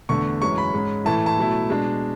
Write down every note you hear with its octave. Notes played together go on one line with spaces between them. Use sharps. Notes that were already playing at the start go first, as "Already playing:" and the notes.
E2 D3 A3 D4 C#6
F#2 E3 G#3 C#4 C#6
B5
G#2 G#3 C#4
A2 E3 A3 E4 A5
A5
B2 F#3 A3 E4
B2 G#3 D4